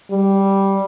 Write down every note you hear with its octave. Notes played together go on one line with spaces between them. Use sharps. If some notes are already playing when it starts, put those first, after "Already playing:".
G3